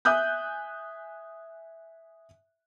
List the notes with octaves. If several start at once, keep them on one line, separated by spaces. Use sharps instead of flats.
E5 G#5 D#6 F#6 G6